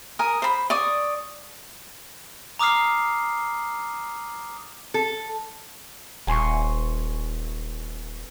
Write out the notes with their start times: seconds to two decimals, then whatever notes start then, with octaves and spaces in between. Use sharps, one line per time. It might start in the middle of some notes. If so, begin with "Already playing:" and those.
0.19 A#4 G#5 D#6
0.42 C5 B5
0.70 D5 C#6 D#6
2.59 A#5 D6 D#6 F6 C7
4.94 A4
6.27 D#1 G#5 C6 C#6